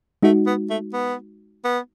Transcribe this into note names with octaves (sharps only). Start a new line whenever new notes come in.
G#3 A3 D#4 F#4
B3
A3
B3
B3